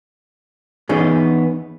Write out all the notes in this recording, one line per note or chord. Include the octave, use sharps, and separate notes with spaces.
E3 B3 C#4 D#4 G#4